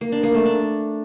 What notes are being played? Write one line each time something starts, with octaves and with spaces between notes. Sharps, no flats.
A#3
D4
A#3
A3
D4